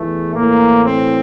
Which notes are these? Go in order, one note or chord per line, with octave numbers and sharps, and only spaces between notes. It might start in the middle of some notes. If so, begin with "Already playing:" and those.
Already playing: E2 E3 A3
A2 E3 A#3
C4